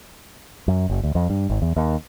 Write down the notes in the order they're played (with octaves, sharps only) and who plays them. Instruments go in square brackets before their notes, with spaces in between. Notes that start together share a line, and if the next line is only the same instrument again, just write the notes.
[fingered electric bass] F#2
F#1
D2
F2
G2
G#1
E2
D#2